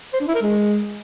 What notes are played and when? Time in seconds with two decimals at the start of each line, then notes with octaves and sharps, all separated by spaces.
0.14 C5
0.21 D4
0.28 E4
0.35 A#4
0.42 G#3